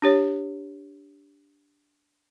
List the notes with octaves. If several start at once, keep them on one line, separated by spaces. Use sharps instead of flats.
D4 G4 C#5